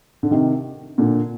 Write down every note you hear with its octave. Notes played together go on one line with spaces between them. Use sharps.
D3
C3 D#3
A#2 D3